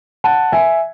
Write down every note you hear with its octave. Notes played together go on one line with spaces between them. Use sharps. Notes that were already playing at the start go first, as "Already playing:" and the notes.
F#5 A5
E5 G#5